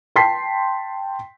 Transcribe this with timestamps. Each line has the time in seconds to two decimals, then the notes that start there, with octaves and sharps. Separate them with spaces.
0.16 G5 A5 C6 B6 C7